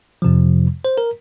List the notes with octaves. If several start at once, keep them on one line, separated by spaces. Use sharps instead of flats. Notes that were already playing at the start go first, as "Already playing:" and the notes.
F2 C3 F3
C5
A#4